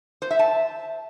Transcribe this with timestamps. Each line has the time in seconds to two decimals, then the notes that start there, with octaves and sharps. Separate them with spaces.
0.22 C5
0.31 E5
0.39 A5